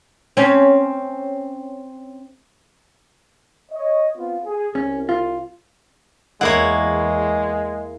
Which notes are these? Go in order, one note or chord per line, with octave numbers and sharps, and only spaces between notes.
C4 C#4
C#5 D#5
B3 C4 F4
G#4
C2 C#4
F4
E2 G#3 A#3 E4 C#5 F#5